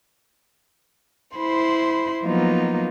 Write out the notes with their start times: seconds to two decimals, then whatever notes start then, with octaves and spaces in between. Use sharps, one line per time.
1.38 E4 C5 B5 C6
2.24 F3 F#3 A#3 B3 D#4 F4